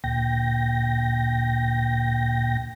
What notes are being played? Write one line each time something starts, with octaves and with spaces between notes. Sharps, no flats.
D2 A#2 G5 A#6